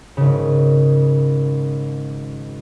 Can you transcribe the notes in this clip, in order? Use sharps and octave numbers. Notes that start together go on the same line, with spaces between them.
G#1 C#3